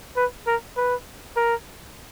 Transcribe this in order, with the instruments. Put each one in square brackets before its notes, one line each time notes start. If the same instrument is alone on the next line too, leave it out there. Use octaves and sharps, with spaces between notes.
[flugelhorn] B4
A#4
B4
A#4